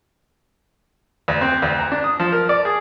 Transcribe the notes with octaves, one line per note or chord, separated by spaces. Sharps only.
D2
C4
D2
A#5
D4
D#6
F3
A#4
D5
G#4